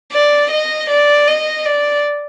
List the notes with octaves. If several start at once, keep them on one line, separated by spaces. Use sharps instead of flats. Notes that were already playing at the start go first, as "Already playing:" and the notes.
D5
D#5
D5
D#5
D5